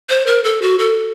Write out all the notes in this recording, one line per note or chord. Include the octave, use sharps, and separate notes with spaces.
C5
A#4
A4
F#4
A4